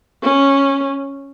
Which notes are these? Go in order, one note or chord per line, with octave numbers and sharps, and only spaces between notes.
C#4